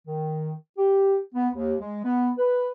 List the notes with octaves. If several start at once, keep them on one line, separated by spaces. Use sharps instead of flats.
D#3
G4
B3
D#2
G#3
B3
B4